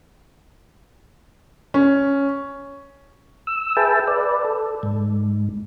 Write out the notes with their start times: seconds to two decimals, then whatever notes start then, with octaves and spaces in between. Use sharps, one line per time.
1.74 C#4
3.47 E6
3.77 G#4 B4 E5 G5 A5
4.07 B4 D5
4.44 A4
4.83 G#2